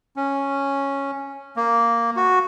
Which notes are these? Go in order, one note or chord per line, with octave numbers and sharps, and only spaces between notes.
C#4
A#3
F#4